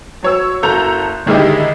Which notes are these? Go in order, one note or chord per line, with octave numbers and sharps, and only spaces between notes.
F#3 C#5 E6
F#1 F#3 A4 A#5 G6 F7
D3 D#3 G#3 D#4 E4 G4